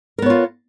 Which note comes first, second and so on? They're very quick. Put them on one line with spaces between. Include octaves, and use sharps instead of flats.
A#4 B3 C#5 F4